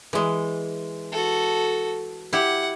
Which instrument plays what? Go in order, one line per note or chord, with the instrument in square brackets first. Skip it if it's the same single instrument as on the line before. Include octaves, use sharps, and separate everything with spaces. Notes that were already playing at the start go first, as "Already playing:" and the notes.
[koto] E3 G#3
[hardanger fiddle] F#4 A4
[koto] E4 G4 [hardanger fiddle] F#5